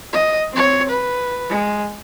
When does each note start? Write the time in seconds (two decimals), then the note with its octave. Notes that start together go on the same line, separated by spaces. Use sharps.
0.13 D#5
0.52 C4 C#5
0.89 B4
1.50 G#3